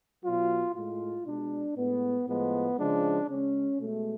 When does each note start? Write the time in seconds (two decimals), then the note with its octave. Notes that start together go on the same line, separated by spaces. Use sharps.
0.24 B2 F#3 F4
0.75 A2 G#3 F4
1.26 B2 G#3 D4
1.77 A2 G#3 B3
2.28 A2 F3 G#3 B3
2.79 C#3 F3 G#3 D4
3.29 C#3 G#3 C#4
3.80 B2 G#3 A3